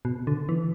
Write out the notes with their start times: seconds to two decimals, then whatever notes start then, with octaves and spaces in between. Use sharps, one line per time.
0.05 B2
0.27 D3
0.49 E3